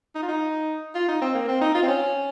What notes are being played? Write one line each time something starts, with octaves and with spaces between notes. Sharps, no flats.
D#4
F4
D#4
F4
D#4
C4
A#3
C4
D#4
F4
C4
C#4